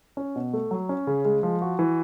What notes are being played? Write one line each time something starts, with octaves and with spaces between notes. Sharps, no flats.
C#4
B2
A3
F#3
C#4
C#3
G#3
F3
F#4
E3